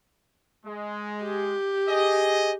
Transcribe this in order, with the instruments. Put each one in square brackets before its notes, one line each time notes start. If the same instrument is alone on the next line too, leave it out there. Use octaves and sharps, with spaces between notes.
[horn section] G#3
[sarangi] G4
[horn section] G#4 D#5